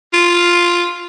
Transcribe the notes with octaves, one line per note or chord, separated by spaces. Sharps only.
F4